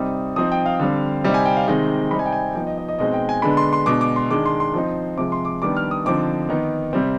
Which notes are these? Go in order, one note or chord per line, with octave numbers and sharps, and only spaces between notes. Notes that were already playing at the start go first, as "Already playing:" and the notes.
Already playing: C3 G3 C4 D#4 D#6
F3 C4 D#4 D#6
G5
F5
D3 G3 C4
C3 G3 C4 D#4
G#5
G5
F5
C3 D#3 G#3 C4 D#4 D#5
C3 G3 C4 D#4 B5
G#5
G5
G#5
F3 B3 D#4 G5
D#5
D#5
D#5
B2 G#3 C4 D#4 D#5
G5
G#5
D3 G#3 B3 D4 B5
C6
C6
B2 G#3 D4 D6
D6
C6
D#3 G#3 D4 D6
C6
C6
F3 C4 D#4
C3 F3 G#3 D6
C6
D6
D#3 G3 B3 D4 D6
F6
D#6
D3 F3 C4 D#4 D6
D#3 B3 D#4
C3 G3 C4